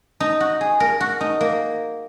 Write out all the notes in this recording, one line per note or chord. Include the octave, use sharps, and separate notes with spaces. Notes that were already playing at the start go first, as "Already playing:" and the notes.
D#4
F#4
G#4
A#4
F#4
D#4
A#3